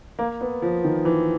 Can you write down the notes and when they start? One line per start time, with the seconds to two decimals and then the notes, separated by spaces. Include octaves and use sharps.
0.19 A#3
0.41 B3
0.62 F3
0.84 D#3
1.05 E3